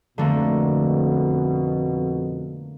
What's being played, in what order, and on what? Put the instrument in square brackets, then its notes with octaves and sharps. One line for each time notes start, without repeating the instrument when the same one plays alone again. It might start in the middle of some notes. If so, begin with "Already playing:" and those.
[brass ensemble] F2 B2 [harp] D3 A3 A#3